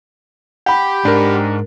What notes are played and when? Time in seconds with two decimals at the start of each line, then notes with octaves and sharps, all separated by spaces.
0.66 G4 F#5 B5
1.05 G#2 D4 A#4